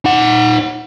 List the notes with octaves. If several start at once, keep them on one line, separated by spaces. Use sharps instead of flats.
D#4 F#5